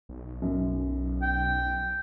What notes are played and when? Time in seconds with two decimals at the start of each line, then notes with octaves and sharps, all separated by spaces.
0.09 B1
0.42 F#2
1.22 G5